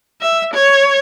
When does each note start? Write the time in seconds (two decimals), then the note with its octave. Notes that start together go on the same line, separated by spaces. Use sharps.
0.21 E5
0.54 C#5